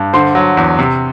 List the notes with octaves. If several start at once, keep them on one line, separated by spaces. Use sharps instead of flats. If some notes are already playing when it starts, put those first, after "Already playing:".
Already playing: G2
D3 C5 C6
F#3
E2
C3